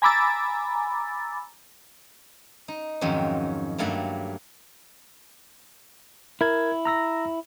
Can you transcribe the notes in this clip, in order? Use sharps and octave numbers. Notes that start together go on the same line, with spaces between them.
G#5 A#5 B5 D6 E6 A6
D#4
F2 G#2 D#3 F#3 C#4
G2 F#3 A3 A#3 F#5 A5
E4 A#4 G#6
A#5 E6 A#6